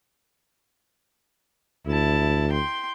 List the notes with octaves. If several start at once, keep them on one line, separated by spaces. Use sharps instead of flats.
D2 E4 A5
G5 C6